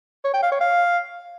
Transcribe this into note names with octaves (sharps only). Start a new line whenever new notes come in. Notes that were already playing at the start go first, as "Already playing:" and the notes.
C#5
G5
F5
C#5
F5